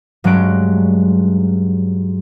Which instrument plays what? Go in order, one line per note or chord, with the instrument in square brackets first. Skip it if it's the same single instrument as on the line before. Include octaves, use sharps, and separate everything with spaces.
[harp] G2 F#3 G#3 C#4 F#6 D7